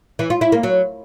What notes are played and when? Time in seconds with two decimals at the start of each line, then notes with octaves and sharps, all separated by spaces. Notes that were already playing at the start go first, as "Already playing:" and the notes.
0.19 E3
0.30 F4
0.41 E4
0.52 A#3
0.63 F#3